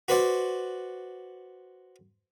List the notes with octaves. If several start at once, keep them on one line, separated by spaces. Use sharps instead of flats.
F#4 B4 C5 D5 F#5